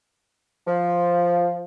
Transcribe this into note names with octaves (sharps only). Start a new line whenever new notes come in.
F3